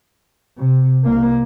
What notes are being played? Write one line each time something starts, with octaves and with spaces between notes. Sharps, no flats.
C3
C2 A#3